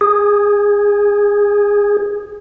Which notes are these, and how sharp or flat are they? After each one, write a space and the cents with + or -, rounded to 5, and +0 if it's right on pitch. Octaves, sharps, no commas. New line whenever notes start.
G#4 -20